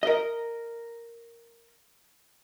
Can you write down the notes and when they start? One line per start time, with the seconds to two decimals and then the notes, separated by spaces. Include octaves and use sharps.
0.03 A#4 D#5